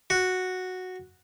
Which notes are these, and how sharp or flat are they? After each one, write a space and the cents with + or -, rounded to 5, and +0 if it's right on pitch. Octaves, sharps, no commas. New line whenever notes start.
F#4 -5